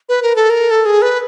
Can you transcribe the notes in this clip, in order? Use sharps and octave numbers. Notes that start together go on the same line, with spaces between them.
B4
A#4
A4
A#4
A4
G#4
B4